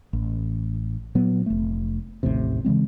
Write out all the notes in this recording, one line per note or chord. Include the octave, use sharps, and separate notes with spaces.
A1
A#2 F#3 B3
F1 A3
A1 D#2 A2 C3
C#3 E3 G#3 C4